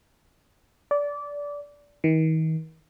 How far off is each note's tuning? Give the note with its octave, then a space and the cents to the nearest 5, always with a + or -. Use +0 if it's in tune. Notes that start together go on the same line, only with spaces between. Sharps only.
D5 -20
D#3 +40